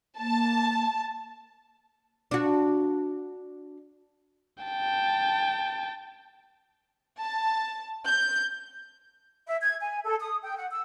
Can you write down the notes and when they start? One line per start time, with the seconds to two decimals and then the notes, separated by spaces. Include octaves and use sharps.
0.18 A#3 A5
2.31 D4 F#4
4.64 G5 A5
7.21 A5
8.07 G6
9.47 E5
9.62 G#6
9.81 G#5
10.04 A4
10.20 D#6
10.43 G5
10.57 F#5
10.70 E6